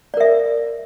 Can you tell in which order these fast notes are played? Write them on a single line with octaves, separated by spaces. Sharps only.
D5 A#4 E5